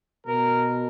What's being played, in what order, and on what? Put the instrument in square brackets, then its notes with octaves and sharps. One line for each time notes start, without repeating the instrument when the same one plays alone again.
[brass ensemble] B2 A#4